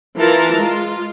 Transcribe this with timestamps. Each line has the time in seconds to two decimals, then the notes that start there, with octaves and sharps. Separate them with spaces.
0.18 E3 F4 A#4 A5 A#5
0.57 G#3 F4